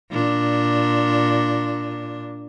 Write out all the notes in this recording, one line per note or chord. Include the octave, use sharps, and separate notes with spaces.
A#2 D4